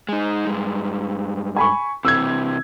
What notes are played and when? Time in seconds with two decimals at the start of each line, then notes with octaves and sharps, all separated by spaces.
0.09 G#3 D#4
0.47 G2 G#3
1.56 G#5 B5 C#6
2.05 C3 E3 E6 G#6